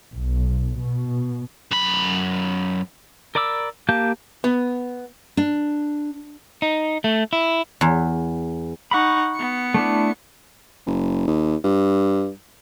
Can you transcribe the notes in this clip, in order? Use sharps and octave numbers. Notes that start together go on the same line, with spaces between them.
B1
B2
F#2 B5
A#4 D5 B5 D6 E6
A#3 G4 F5 A5 G6
B3
D4
D#4
A3
E4
E2
D#4 F#5 B5 C#6
B3 C#7
A3 D4 E4
F#1
D#2
G2